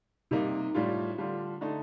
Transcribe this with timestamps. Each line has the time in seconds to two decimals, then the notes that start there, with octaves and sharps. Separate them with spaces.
0.31 C3 G3 A#3 D#4
0.74 A2 G3 D4 F4
1.18 D3 G3 D4 F4
1.61 D3 A3 D#4